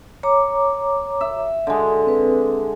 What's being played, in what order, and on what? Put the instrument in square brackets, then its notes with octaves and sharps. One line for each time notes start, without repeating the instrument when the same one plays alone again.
[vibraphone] C#5 A#5 D6
[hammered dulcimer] E5
D3 G#3
[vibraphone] C4 B4